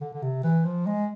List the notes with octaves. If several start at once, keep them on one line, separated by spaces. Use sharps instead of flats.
D3
D3
C3
E3
F3
G#3